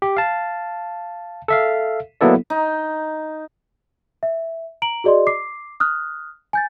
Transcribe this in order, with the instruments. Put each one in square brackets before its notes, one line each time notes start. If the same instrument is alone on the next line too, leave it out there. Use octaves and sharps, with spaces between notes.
[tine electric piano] G4
F5 A5
A4 E5 F5
F#3 A#3 B3 E4 A4 D5
[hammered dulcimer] D#4
[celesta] E5
A#5 D7 F#7
F#4 G#4 D5 D#5 C6
D6 C7
D#6 F6 F#6
G#5 G6 A6